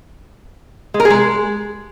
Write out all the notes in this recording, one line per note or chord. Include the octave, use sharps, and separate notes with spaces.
G#3
A#4
G#4
G#3